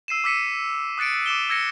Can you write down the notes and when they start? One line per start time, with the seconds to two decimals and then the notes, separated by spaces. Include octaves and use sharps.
0.08 E6 C7 D#7 E7
0.24 D6 E6 B6 C#7 D#7
0.98 D#6 F#6 A6 C#7 D7
1.26 D6 D#7 E7 G7
1.49 E6 G#6 A#6 C#7